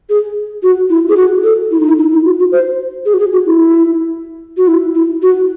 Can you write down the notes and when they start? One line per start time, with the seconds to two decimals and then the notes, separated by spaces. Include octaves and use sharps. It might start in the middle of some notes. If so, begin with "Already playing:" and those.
0.09 G#4
0.63 F#4
0.90 E4
1.09 G#4
1.17 F#4
1.44 A4
1.71 E4
1.80 D#4
1.89 E4
1.98 D#4
2.12 E4
2.25 F#4
2.39 F#4
2.52 C5
3.05 G#4
3.14 F#4
3.19 G#4
3.33 F#4
3.46 E4
4.57 F#4
4.67 E4
4.95 E4
5.22 F#4